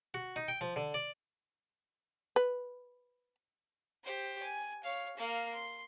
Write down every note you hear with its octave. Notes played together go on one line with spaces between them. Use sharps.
F#4
D#4
G5
F3
D3
D5
B4
G4 C5
G#5
C#5 F5
A#3 F5
C6